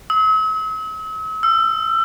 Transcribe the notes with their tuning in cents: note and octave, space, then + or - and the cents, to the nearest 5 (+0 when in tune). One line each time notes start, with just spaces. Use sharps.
E6 -45
E6 +30